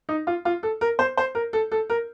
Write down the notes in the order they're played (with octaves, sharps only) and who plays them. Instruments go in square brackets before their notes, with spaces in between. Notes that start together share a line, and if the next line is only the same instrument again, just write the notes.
[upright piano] D#4
F4
F4
A4
A#4
C5
C5
A#4
A4
A4
A#4